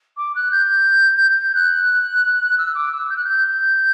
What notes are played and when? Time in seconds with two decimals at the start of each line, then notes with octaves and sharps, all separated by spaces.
0.17 D6
0.36 F#6
0.52 G6
1.55 F#6
2.58 E6
2.75 D6
2.92 E6
3.10 G6
3.17 F#6
3.24 G6